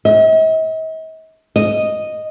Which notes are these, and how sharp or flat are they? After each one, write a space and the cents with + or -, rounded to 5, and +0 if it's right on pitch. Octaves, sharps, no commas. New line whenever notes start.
D#5 +45
D#5 -5